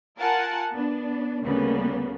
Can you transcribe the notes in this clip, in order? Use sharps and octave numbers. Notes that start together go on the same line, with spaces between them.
F4 A#4 F#5 G#5 A5
B3 D4
D2 C#3 G3 A#3 B3